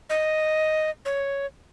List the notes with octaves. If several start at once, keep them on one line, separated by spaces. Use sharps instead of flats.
D#5
C#5